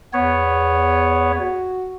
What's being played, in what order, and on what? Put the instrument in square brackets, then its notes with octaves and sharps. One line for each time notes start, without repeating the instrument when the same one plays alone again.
[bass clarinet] E2 [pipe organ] B3 C#5
[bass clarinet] F#4